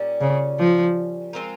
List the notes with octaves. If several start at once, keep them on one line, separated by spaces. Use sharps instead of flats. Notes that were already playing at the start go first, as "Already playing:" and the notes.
Already playing: A#2 G3 C#4
C#3
F3
G#3 C4 F4 A#4